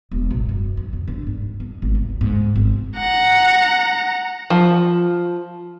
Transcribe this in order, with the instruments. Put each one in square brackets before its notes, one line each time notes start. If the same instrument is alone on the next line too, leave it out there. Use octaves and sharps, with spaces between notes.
[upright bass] E1
A1
F#2
F2
C#3
D3
G#2
F2
G#1
C#2
G#2
G#1
[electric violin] F#5 A#5
[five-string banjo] F3